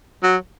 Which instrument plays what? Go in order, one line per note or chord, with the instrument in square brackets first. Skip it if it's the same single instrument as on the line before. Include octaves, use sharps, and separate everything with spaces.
[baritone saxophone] F#3